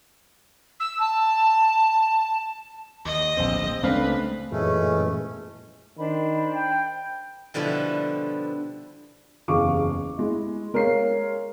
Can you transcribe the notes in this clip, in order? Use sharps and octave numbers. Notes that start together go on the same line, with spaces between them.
E6
A5
D#2 D#5
D1 A#1 G2 C4
C#2 A3 A#3 C4 D4 B4 F5
F#2 A#2 E3 G#3 A3 C#4
D#3 D4 C5 B5
G5
B2 D3 F3 G3 E4
F#1 E2 G#4 F5 C#6 D6
G#3 E4
G#3 A#4 C#5 F5 C7